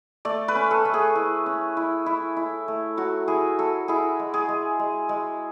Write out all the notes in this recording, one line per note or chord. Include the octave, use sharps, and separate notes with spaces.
A3 D5
B4
C#4
A4
A3
G#4
E4
C#4
E4
E4
E4
A3
F#3 F#4
E4 G#4
F#3 A4
E4 G#4
G#3
G#4
G#3
G#3
G#3